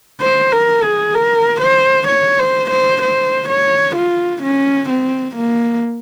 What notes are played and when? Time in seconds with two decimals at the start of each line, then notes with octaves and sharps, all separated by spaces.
0.21 C5
0.52 A#4
0.83 G#4
1.14 A#4
1.61 C5
2.08 C#5
2.39 C5
2.71 C5
3.02 C5
3.49 C#5
3.96 F4
4.43 C#4
4.89 C4
5.36 A#3